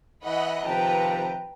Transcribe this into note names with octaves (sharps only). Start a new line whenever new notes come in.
E3 D#5 F#5 B5
C3 D#3 F3 B4 G5 A5 A#5